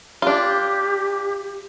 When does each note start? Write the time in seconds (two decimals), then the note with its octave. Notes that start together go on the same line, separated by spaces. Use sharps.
0.22 D4 F4 G4